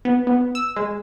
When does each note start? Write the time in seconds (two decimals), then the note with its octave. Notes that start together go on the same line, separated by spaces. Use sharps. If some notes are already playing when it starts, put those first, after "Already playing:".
0.05 B3
0.27 B3
0.55 E6
0.76 G#3